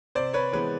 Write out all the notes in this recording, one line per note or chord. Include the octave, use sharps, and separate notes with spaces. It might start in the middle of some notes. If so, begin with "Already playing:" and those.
C3 C5 D5
B4 C#5
E3 G#3 B3 B4 C#5